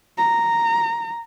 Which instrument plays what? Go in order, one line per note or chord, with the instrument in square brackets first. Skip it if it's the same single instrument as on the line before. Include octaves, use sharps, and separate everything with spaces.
[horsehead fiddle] A#5